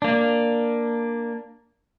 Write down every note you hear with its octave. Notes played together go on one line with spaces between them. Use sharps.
A#3 D4